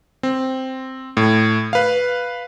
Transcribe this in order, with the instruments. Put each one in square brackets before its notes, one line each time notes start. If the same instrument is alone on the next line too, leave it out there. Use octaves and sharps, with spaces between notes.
[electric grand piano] C4
A2
B4 F5